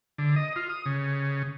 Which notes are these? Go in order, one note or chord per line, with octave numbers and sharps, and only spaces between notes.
D3
D#5
F4
D#6
C#3